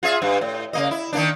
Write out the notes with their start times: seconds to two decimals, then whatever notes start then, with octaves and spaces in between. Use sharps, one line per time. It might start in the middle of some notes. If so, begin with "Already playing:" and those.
0.03 F4 G#4 E5
0.22 G2
0.41 A2
0.73 C#3 A#3 D#5
0.91 E4
1.13 D#3 A#3 D4